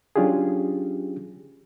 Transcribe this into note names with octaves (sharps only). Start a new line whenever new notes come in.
F#3 C#4 D4 F4 G4 G#4